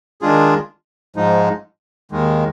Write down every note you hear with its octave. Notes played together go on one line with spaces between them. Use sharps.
D#3 G#3 D4 F4 G#4
G#2 F3 G#3 D#4
D#2 D#3 G#3